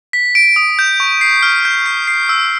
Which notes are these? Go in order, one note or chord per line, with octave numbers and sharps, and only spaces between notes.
B6
D7
D#6
G6
C#6
C7
F6
G6
C7
C7
E6